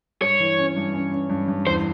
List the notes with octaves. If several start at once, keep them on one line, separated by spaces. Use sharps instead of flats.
G2 C#5
E3
C#4
G2
C#4
C#4
G2
G2
E2 C5